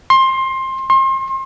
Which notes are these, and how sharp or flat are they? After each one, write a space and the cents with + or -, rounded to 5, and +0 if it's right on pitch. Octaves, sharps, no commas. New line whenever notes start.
C6 +20
C6 +35